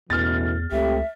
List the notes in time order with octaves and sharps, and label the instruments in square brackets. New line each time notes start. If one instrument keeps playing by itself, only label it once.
[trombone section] A1 B2 E3 [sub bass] E2 [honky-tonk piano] F6 A6
[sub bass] C#2 [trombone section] A3 C4 G4 [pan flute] E5